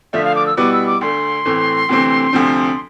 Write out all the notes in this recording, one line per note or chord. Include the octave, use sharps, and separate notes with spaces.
D3 F3 A3 D4 F4 E5
F5
D6
E6
B2 G3 B3 E4 B4 D6
E6
D6
D2 D3 A3 C6
A2 E3 A3 C4
D2 C3 E3 A3 C4
D2 C3 F3 C4